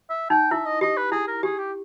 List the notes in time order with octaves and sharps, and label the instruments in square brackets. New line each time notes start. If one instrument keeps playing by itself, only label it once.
[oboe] E5
[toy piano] D#4 [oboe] G5
[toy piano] E4 [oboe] E5
[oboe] D#5
[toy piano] G4 [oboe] D#5
[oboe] B4
[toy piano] E4 [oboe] G#4
[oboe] A#4
[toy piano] G4 [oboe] G#4
[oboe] G4